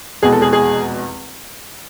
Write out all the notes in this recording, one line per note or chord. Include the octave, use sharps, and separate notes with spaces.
F1 E2 B2 G#3 G#4
A4
G#4
G#4